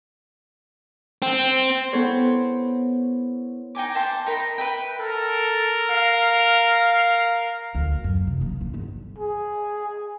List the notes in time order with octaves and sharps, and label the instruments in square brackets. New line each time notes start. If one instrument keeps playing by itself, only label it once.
[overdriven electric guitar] C4
[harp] B3 E4 A4 C5 C#5
[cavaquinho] D#4 G5 G#5 D6
C5 E5 G5 A5
D#4 A#4 G5 B5
B4 E5 G5
[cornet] A4 [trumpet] A#4
[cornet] F5
[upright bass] D2
F#2
C3
A#3
E3
G1
[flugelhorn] G#4